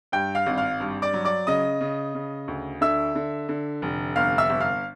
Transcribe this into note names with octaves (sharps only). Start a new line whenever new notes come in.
G2 G5 G6
F5 F6
G#1
F5 F6
G2
D5 D6
F#3
D5 D6
C#3 D#5 D#6
C#3
C#3
D2
D3 E5 E6
D3
D3
F1
G1 F5 F6
E5 E6
G1
F5 F6